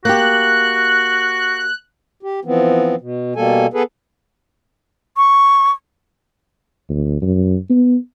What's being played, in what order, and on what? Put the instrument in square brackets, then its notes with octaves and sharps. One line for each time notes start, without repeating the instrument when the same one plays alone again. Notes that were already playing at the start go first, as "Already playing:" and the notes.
[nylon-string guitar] A#3 G4 [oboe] F#4 [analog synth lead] F#6
[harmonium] G4
E3 F3 B3 C4
B2
B2 G3 A#3 A4 G#5
B3 G#4 A4 B4
[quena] C#6
[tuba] D2
F#2
B3